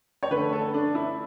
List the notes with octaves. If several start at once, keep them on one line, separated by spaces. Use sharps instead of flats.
C#5
D3 A3 B4
A4
D4
E4